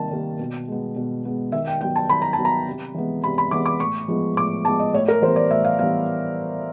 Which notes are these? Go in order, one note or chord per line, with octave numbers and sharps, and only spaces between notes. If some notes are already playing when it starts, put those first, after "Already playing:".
Already playing: C3 D#3 G3 A#3 A5
D#3 G3 A#3
B2
G#3 B3
B2
G#3 B3
D#3 E5
G5
F#3 B3 G5
A5
D#3 B5
A#5
A5
F#3 B3
A#5
C3
E3 G#3 B3
C3 B5
B5
E3 G#3 B3 D6
D6
A2 C#6
F3 G#3 B3
A2 D6
F3 G#3 B3 A5
D#5
A2 C#5
A#4
E3 G3 B3 C5
D5
A2 E5
F5
E3 G3 B3 F5